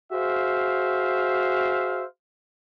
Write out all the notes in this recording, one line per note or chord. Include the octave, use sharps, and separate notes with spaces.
F#4 G#4 C5 E5 F5